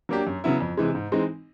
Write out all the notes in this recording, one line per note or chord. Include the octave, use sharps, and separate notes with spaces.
F#3 A#3 D4 G4
F#2
C#3 F#3 B3 E4
F2
C3 E3 G#3
G#2
E3 G#3 C4 D#4